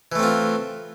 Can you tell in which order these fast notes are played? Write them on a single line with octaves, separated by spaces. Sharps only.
E3 A3 C4 F4